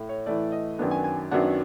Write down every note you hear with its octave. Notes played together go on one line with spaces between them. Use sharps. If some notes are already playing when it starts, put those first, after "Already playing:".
Already playing: A2
C#5
A2 E3 A3 D5
D#5
F#2 D#3 F#3 B3 D4
G#5
G#5
F#2 D#3 F#3 B3 D4 F#5